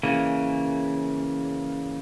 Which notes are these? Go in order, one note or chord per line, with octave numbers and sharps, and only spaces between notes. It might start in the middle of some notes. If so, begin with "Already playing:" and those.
C#3 E3 A#3